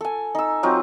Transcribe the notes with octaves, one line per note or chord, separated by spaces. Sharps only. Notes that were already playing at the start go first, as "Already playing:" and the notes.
A4 G#5
D#4 E6
F#3 C4 D#4 F4